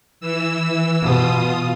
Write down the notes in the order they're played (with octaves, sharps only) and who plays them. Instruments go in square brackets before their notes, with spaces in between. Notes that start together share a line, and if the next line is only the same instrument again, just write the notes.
[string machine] E3 E6
[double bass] B2 [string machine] F4 D#6